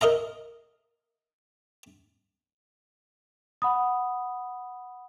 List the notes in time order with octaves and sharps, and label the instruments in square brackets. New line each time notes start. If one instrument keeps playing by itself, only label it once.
[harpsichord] A#4 D#5 E5 A#5
[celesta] F#5 B5 D#6